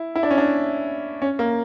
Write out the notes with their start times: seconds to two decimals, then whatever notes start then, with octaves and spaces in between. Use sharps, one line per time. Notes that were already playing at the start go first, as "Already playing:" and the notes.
Already playing: E4
0.15 E4
0.23 D4
0.31 C#4
0.38 D4
1.22 C#4
1.39 A#3